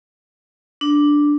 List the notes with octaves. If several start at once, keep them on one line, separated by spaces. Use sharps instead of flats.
D4